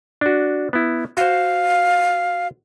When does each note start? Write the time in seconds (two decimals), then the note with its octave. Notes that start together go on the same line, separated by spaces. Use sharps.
0.21 D4 F#4
0.73 B3 E4
1.17 F#4 C5 F5